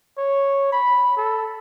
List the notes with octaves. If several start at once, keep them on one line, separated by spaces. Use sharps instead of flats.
C#5
B5
A4